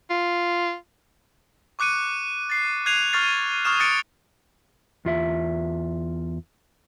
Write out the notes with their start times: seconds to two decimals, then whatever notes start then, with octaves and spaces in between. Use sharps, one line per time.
0.10 F4
1.79 C#6 D6 F#6 C#7 D#7
2.50 A6 C7
2.86 F#6 G#6 C7 D#7 F7
3.13 C#6 F6 A6 C7
3.65 C#6 D#6 F6 E7
3.80 D#6 F#6 A6 C#7 D7
5.05 E2 F4 E5